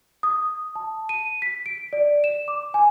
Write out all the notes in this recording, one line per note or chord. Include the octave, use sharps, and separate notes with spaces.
D#6
A5
D#7
B6
D7
D5
E7
D6
G#5